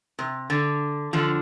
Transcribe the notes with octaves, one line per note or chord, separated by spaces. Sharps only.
C3
D3
D3 F3